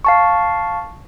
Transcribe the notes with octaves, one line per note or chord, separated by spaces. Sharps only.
F5 A5 C#6